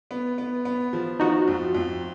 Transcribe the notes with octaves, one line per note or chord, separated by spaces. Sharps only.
B3
B3
B3
F3
F3 D#4 F#4
F2
F2